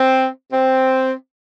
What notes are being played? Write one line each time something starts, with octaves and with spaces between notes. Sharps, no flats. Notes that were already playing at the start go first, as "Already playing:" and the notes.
Already playing: C4
C4